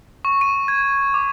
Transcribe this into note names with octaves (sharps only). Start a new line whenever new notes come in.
C#6
D#7
G#6
D6